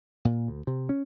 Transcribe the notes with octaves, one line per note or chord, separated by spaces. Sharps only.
A#2
D2
C3
C#4